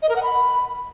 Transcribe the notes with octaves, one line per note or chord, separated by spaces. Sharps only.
D#5
A#4
F#5
B5